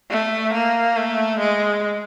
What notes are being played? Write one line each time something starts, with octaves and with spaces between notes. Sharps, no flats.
A3
A#3
A3
G#3